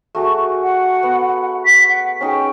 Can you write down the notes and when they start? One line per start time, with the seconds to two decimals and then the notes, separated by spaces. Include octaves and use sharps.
0.15 A3 F#4 G#4
0.61 F#5
1.03 B3
1.65 B6
1.87 F#5
2.21 C#4 D#4 G#4 G5